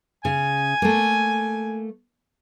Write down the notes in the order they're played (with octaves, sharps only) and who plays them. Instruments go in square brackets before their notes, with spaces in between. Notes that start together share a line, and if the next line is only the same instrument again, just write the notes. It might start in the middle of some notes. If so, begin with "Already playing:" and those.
[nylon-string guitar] C#3 [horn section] G#5
[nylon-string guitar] A3 A#3